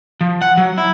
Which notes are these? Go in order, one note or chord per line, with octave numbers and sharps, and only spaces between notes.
F3
F#5
F#3
E4